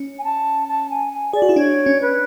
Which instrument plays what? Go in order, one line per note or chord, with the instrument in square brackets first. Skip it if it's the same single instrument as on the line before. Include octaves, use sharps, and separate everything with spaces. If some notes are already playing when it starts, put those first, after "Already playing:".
Already playing: [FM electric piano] C#4
[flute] G#5
A5
A5
G#5
G#5
[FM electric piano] G#4 [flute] D5
[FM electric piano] F#4
E4
[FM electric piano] D4 [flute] C#5
[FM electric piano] C#4
[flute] B4